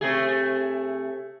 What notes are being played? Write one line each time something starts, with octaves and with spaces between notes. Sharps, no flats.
C3 A3 G#4